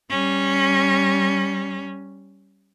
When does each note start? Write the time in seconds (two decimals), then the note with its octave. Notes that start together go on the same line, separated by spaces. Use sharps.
0.10 G3 C#4